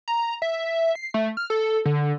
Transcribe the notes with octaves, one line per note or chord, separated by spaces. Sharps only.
A#5
E5
C7
A3
F6
A4
D3